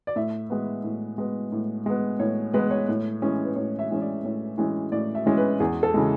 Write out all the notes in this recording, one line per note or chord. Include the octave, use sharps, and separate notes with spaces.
D5
A2 E5
G#3 B3
A2
G#3 B3
A2
G#3 B3
A2 C#5
G#3 B3 B4
C#5
A2
E3 G#3 C#4
B4
A2 C#5
E5
E3 G#3 C#4
D5
A2 C#5
E3 G#3 C#4
A2 D5
E5
E3 G#3 C#4
B4
E2 G#4
A4
C#3 E3 G#3